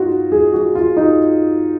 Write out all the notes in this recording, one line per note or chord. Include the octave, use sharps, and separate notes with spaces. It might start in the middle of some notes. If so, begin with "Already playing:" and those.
Already playing: D#4 F4 F#4
G#4
F#4
F4
D#4